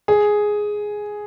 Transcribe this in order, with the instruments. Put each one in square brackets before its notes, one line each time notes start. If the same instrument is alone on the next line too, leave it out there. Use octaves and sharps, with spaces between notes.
[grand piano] G#4